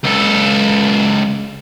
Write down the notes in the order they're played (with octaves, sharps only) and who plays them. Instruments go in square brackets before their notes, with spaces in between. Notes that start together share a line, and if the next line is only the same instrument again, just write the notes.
[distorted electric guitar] C#2 A4